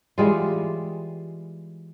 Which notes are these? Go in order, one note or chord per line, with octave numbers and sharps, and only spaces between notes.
E3 G3 G#3 F4